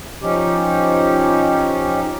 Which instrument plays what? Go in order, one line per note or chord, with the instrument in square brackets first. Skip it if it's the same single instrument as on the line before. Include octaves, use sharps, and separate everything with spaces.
[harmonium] F3 C#4 D#4 G4